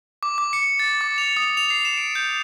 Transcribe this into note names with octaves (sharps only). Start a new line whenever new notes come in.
D6
D6
C#7
A6
D6
F7
D#6
F7
C7
E7
D7
G6